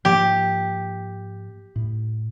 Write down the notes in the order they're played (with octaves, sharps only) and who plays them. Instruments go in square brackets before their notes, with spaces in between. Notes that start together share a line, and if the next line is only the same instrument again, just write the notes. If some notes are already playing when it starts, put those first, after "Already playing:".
[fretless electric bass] G#2 F3 A#3 [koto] G4
[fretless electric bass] A2